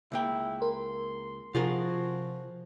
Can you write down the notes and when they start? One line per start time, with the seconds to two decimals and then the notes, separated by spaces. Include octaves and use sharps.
0.12 C#2 A#3 E4 G5
0.62 A#4 C6
1.55 C3 F3 F4 F#4 G#4 A#4